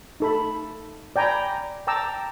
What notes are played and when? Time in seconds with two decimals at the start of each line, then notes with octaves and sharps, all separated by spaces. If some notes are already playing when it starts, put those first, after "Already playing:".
0.20 D#4 A4 B5
1.16 D5 G5 G#5 A#5 B5
1.87 G5 A5 A#5 D6 E6